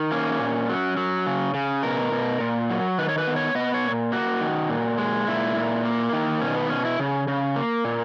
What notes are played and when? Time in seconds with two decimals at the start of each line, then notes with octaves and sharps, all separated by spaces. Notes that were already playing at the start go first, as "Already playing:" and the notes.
Already playing: D#3
0.12 A#3 C#4
0.40 A#2
0.70 F#3
0.97 F#3
1.27 C#3
1.54 C#3
1.83 B2 A#4
2.12 B2
2.40 A#2
2.70 F#3
2.98 D#3 B4
3.09 C#5
3.18 B4
3.27 B3
3.36 C#5
3.55 B3 D#5
3.74 C#5
3.84 A#2
4.12 A#3 F#4
4.41 D#3
4.69 A#2
4.98 G#3
5.27 A#2 E4
5.56 A#2
5.85 A#3
6.13 D#3
6.41 B2 C#4
6.55 B3
6.69 B2 C#4
6.85 E4
6.99 C#3
7.28 C#3
7.56 A#3
7.85 A#2